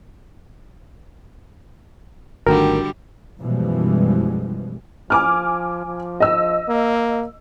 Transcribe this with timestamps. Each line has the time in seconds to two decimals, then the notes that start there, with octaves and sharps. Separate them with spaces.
2.47 G#1 D3 D#3 G3 A3 F#4 A#4 G5
3.39 F#2 B2 E3 F3 G3 G#3
5.10 F3 G#5 D6 F6
5.86 F3
6.20 D#5 E6
6.68 A#3